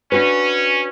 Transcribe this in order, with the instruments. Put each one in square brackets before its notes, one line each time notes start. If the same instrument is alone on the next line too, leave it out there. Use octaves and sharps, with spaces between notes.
[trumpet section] C#4 [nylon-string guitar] D4 F#4 B4